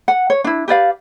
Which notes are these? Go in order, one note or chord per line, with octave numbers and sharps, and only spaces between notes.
F#5
C#5
D4 E4
G4 B4 D5 F5